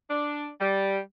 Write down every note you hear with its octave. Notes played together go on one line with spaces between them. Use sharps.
D4
G3